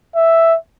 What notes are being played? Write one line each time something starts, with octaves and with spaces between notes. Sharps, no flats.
E5